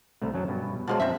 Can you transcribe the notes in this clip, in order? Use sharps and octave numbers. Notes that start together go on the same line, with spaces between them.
C2 A3
F#2 F#3 A5
G2 B2
B2 D3 F3 F#3 G#3
F#2 C4 E5